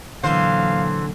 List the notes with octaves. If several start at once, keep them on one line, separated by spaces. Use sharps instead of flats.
A#2 D3 E3 F#3 C5 F5